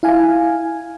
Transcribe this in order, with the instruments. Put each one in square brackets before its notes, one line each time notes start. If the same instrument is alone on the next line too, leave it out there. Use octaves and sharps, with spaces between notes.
[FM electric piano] E4 F5 G#5